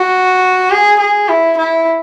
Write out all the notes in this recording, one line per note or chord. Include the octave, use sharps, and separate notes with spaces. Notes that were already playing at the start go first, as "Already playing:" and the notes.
Already playing: F#4
G#4
G#4
E4
E4